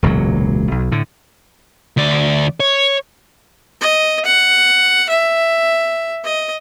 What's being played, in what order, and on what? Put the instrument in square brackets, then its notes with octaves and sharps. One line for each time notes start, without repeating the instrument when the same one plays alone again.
[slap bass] E1 C#2 A#2 F#3
B1
A2 D3
[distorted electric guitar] D2 D5
C#5
[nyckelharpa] D#5
F#5
E5
D#5